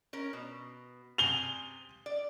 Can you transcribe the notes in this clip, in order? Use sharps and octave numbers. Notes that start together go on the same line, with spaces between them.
C#4 A#4
B2
C3 G#5 F7 G7
D5